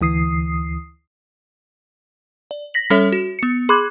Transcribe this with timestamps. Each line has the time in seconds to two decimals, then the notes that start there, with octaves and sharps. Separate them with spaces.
0.01 D2 E3 D#6 C7
2.51 D5
2.74 A#6 B6 F#7
2.90 G3 C#4 A4 C#5 E5
3.12 F#4
3.39 B3 C#7
3.69 G#4 B5 C6 D6 F#6 G#6